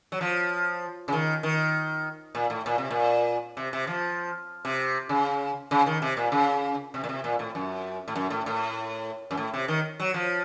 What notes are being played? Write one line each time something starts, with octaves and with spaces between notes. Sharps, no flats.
F#3
F3
C#3
D#3
D#3
A#2
A2
A#2
C3
A#2
C3
C3
F3
C3
C#3
C#3
D#3
C3
A#2
C#3
C3
A#2
C3
A#2
A2
F#2
A2
F#2
A2
A2
F#2
A2
C3
D#3
F#3
F3